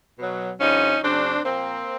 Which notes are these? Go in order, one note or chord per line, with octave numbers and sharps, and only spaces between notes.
B2 F#3
G2 D3 F3 C#4 D#4
F#2 C#3 F#3 C4 D4
A#2 F3 A#3 C4